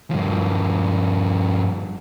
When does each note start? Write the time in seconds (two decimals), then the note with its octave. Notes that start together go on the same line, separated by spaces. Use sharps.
0.11 G2 F3